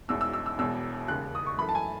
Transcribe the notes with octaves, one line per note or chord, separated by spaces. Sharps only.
E1 E2 B2 E6
E6
E6
E6
E1 E2 B2 E6
E1 D#2 C#3 F#6
D#6
C#6
F#2 E3 A3 B5
A5
G#5